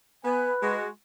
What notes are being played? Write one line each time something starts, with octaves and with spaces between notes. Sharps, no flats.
B3 B4 G#5
G#3 F#4